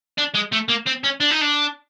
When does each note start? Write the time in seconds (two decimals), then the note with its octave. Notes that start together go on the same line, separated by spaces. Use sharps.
0.18 D4
0.35 G#3
0.53 A3
0.69 A#3
0.87 C4
1.04 C#4
1.20 D4
1.31 D#4
1.41 D4